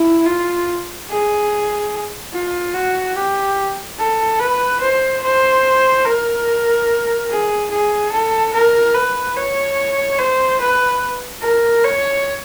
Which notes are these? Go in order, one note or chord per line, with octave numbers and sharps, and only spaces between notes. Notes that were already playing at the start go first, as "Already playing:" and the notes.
Already playing: E4
F4
G#4
F4
F#4
G4
A4
B4
C5
C5
A#4
G#4
G#4
A4
A#4
B4
C#5
C5
B4
A#4
C#5